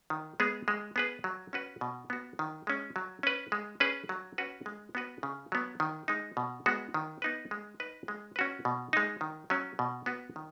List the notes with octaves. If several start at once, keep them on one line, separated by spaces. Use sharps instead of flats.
D#3
G#3 B3 G#4
G#3
B3 G#4 B4
F#3
C#4 F#4 B4
B2
B3 F#4
D#3
G#3 C#4
F#3
C#4 B4
G#3
C#4 G#4 B4
F#3
C#4 F#4 B4
G#3
B3 F#4 B4
C#3
F#3 B3
D#3
G#3 D#4
B2
G#3 B3 F#4
D#3
B3 D#4 B4
G#3
D#4 B4
G#3
C#4 F#4 B4
B2
G#3 D#4
D#3
F#3 C#4
B2
B3 F#4 B4
D#3